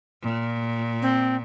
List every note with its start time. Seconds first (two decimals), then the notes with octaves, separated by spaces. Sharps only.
0.22 A#2
1.02 C4